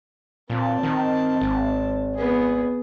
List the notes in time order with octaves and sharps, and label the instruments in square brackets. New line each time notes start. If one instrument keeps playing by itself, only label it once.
[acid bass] A#2 [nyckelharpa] C4 A5
[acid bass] D#3
G#1
[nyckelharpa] B3 G#4